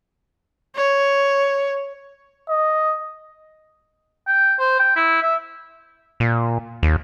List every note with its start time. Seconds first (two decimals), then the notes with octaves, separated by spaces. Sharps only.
0.75 C#5
2.49 D#5
4.28 G5
4.59 C5
4.80 G5
4.96 E4
5.23 E5
6.20 A#2
6.83 D#2